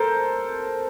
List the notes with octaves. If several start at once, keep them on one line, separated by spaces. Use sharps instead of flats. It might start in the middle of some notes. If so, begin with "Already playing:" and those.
Already playing: A4 A#4 C5